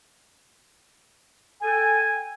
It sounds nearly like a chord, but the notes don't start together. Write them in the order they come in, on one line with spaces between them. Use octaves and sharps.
G#5 A4 G5